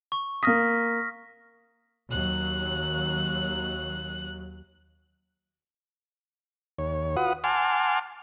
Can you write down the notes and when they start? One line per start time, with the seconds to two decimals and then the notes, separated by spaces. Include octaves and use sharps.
0.12 C#6
0.43 A#3 D#6 F6 A#6 B6
2.11 D#2 F#3 F#6
6.78 D#2 C#5
7.17 F4 F#4 B4 F#5 D#6
7.44 F#5 G#5 A5 C6 D6 F6